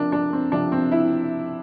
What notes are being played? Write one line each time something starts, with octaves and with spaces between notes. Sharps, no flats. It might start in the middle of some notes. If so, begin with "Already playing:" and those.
Already playing: C3 F3 D4 A#4
D4
C4
C3 F3 D4
C4
E4